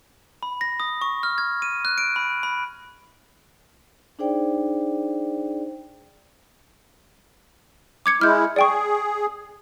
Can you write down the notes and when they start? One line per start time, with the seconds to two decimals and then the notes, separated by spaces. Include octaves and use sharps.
0.43 B5
0.61 A#6
0.80 D#6
1.02 C#6
1.23 F6
1.38 G#6
1.62 D#7
1.85 F#6
1.98 D7
2.16 B5
2.43 B5
4.19 D4 D#4 G#4 C5 D5 G5
8.06 D6 G#6 C#7
8.21 G#3 E4 F6 G6
8.56 G#4 D5 G5 C#6